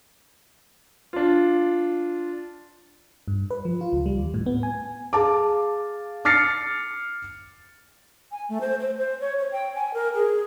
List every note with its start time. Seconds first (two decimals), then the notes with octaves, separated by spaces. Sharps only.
1.13 D4 F4
3.28 G2
3.51 B4
3.65 F3
3.81 F4
3.93 C#2
4.06 G3
4.17 D#2
4.34 A2
4.46 B3
4.63 G#5
5.13 G#4 F5 A5 D6
6.25 D6 F6 A6 C7 C#7
8.32 G#5
8.49 A3
8.61 C5
8.80 C5
8.98 C5
9.21 C#5
9.39 C#5
9.52 G5
9.75 G#5
9.94 A#4
10.14 G#4